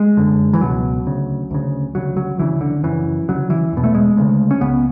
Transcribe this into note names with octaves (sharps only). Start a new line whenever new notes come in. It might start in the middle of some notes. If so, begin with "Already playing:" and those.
Already playing: G#3
F#2 D3
E3
C#2 B2 F#3
D2 C#3
D2 C#3
D2 C#3 F#3
F#3
D2 C#3 E3
D3
F#2 C#3 E3
D2 C#3 F#3
E3
E2 B2
A3
G#3
D2 C#3
C#4
C#2 C#3 B3